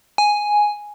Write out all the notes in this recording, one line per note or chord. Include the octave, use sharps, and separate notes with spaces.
G#5